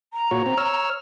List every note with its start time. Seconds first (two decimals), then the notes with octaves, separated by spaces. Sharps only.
0.14 A#5
0.31 A#2 F#4 C#5
0.46 C4
0.57 C#5 E6 F6